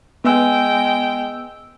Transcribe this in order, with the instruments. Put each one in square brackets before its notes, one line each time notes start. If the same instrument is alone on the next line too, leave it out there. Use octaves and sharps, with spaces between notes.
[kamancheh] G#3 G5 [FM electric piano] B3 E6